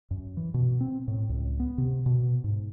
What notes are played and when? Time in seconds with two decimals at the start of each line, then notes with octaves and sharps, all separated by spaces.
0.11 F#2
0.37 E3
0.54 B2
0.81 C4
1.08 A2
1.29 C#2
1.60 B3
1.78 C3
2.06 B2
2.44 G#2